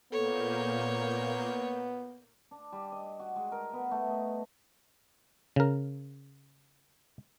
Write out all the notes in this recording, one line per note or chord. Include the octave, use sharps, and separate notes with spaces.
A#2 A#3 B3 A4 C#5 G6
D4
G3
D#5
F#4
G#3
A#4
B3
A3
D#5
C#3 A#4